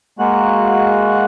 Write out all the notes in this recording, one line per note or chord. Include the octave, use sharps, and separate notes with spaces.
G#3 A#3 F#4 F#6